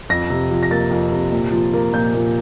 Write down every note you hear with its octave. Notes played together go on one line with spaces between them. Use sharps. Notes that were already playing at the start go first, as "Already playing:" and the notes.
F2 A#6
C3
F3
A#6
A#3 A6
F2
C3
A#2
F3
A#3
A#2 G6
A#2